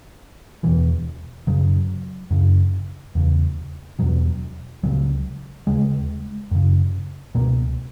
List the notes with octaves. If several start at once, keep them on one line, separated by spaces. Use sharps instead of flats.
E2 B2 E3
F#2 C#3 F#3
F#2 C#3
E2 C#3
E2 B2 F#3
C#2 C#3 F#3
D#2 C#3 G#3
F#2 C#3
C#2 B2 A#3